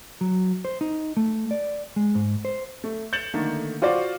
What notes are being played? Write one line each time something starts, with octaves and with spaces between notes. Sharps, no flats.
F#3
C5
D#4
A3
D5
G#3
G#2
C5
A3
G6 A6 C#7 E7 F#7
D3 D#3 A3 A#3
F4 F#4 C5 D5 F5